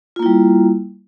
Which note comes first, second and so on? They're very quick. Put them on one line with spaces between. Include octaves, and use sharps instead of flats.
F4 A#3 E4 G3